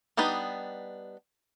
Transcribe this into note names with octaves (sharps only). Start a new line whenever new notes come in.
G3 B3 D4 D#4 B4